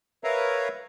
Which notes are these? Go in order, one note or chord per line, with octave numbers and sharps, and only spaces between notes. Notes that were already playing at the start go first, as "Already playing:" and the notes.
A#4 B4 C#5 E5 F5 A#5